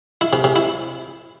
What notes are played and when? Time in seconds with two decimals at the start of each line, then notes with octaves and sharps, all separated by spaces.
0.21 E4
0.33 C3
0.44 C3
0.56 E4